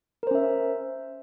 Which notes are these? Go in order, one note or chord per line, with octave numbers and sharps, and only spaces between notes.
C#4 A#4 C5 E5